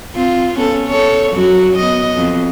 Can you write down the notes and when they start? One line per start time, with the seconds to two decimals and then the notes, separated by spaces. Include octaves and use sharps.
0.15 C4 F4
0.58 B3 C#4 A4
0.87 A4 C#5
1.32 F#2 F#3 F#4
1.76 B3 D#5
2.17 F2